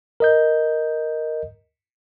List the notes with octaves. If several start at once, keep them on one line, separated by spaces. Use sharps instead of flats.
A#4 D#5 G6